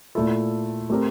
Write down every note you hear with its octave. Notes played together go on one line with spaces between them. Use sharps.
A#2 A3 E4 A4
A3 C4 G4 A#4